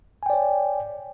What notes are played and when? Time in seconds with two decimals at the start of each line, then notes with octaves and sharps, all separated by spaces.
0.23 G#5
0.26 G5
0.30 D5
0.33 C#5